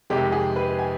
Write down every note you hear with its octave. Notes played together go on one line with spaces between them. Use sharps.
F2 C3 D#3 G#3 G4
G#4
B4
G#5